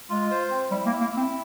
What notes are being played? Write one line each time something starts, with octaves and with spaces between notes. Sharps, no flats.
G#3 F4
C5
C4
G3 E4
A#3
E4
A#3
E4
C4